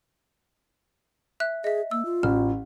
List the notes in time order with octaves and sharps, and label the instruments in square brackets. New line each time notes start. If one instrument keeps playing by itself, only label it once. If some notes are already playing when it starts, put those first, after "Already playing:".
[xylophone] E5 F#6
[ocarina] G#4 [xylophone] D#5 E5
[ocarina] A#3 [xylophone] E6
[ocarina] F4
[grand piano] A1 [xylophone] F6